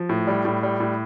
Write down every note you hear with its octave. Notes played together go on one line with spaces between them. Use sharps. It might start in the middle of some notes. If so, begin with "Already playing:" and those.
Already playing: F3
A2
G3
A2
G3
A2